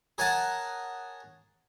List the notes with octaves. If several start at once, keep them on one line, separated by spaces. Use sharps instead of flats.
G#4 A#4 C#5 F#5 G#5 A5